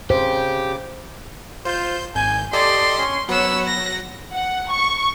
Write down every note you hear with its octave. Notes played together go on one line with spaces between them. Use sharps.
C#3 G4 C5 D6
F4 C5 G6
G#1 G#5 G6
G4 A4 D5 D#5 C6
C#4
F#3 B3 C#5 F#5 E6
A#6
F#5
C#6